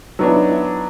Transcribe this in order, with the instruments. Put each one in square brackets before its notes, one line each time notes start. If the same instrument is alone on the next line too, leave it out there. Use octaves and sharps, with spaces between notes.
[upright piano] F#3 B3 D4 [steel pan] D#4
[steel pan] E4
D#4
E4